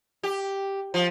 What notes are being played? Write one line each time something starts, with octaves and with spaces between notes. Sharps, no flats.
G4
F3